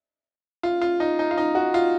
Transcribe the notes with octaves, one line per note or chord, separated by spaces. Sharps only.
F4
F4
D#4
D#4
F4
D#4
F#4
F4